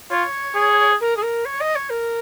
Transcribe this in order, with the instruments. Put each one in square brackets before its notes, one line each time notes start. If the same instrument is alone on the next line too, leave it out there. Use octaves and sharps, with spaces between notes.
[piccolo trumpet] F4 [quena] C#5
[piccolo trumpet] G#4
[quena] A#4
G#4
A#4
C#5
D#5
C#5
A#4